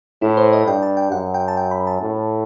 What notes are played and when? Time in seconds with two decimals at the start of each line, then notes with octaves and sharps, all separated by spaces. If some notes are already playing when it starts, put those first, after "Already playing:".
0.22 A2 E4
0.37 C5
0.53 D#5
0.67 G2 G5
0.83 A5
0.97 G5
1.12 F#2 F#5
1.34 G5
1.48 A5
1.57 G5
1.71 B5
1.87 A5
2.02 A2